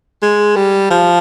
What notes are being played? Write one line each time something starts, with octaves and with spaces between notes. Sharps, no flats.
G#3
G3
F3